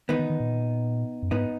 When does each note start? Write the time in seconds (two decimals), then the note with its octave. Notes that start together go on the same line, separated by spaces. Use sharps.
0.09 D#3 B3 D#4
0.19 D#3
0.30 D#3
0.40 A#2
1.23 F#2
1.31 G#2 B3 D#4